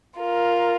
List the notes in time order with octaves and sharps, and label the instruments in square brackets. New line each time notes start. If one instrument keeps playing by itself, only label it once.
[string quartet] F4 A#4